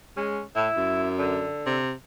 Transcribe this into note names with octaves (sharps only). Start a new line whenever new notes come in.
G#3 C#4
A2 E4
F#2
D3
C3